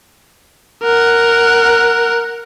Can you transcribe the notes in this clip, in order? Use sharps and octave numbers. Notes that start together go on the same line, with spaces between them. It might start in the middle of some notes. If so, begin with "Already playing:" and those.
A#4 F#5